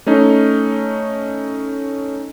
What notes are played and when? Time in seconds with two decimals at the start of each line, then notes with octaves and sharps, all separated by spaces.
0.06 A3 C#4 D#4